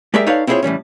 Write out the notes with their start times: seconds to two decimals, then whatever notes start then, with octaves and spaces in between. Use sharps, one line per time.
0.14 G#3 G4 G#4 A#4 D5 E5
0.27 D#4 A4 B4 C#5 D5 F5
0.47 C4 E4 F4 G#4 C5 C#5
0.63 A2 E3 G3 C#4